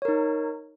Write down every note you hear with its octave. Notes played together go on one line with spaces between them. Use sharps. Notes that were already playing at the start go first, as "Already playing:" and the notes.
D#4 A#4 C#5